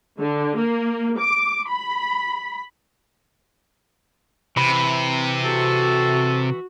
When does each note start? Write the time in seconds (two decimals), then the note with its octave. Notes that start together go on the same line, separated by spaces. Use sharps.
0.19 D3
0.57 A#3
1.18 D6
1.69 B5
4.57 C3 E3 B5
5.45 F#4 A4